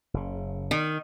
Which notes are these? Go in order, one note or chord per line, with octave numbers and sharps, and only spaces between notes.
F#1 C#3
D#3